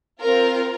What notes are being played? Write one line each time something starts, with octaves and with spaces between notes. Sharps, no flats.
C4 F4 A#4